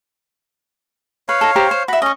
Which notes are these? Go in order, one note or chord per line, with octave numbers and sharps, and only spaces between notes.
B4 C#5 F5
D#4 A4
G4 C5 A#5
C5
F#4 E5 B5
C#4 D#5 C#6